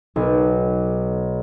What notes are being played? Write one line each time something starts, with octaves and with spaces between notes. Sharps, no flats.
B1